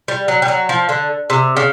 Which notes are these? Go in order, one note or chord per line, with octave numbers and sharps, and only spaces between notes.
G3
F#3
G3
F#3
F3
D3
C3
C#3